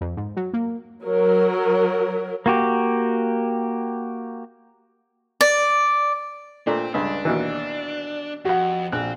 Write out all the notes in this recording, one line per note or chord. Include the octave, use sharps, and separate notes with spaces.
F2
G#2
F#3
A#3
F#3 A#4
A#3 F#4 G4
D5
A#2 A3 C4 D4
C#2 G2 D4
D#2 B2 E3
F2 F#4 F#5
A#1 C4 F#6